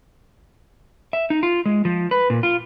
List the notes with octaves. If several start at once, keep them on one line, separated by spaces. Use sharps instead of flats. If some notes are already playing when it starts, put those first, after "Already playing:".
E5
D#4
F4
G#3
F3
B4
A#2
F4